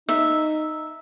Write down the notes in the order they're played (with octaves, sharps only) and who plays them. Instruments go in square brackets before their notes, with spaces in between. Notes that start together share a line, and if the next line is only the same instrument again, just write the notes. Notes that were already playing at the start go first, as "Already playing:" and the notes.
[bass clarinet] D#4 [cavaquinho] E5